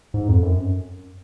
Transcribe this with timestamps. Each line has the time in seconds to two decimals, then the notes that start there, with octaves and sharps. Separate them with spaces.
0.14 G#2
0.28 F2
0.42 F#2